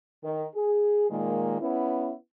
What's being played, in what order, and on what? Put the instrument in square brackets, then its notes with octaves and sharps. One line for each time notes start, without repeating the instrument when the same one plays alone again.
[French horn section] D#3 A#4
G#4
A#2 D#3 G#3 A#3
B3 C#4 E4